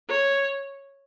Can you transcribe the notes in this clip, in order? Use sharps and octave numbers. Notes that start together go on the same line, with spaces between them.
C#5